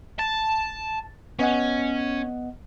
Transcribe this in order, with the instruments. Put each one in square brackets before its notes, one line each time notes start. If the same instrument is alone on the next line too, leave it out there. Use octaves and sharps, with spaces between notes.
[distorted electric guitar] A5 [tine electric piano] A6
[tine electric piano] B3 D#5 F#5 [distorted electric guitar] C#4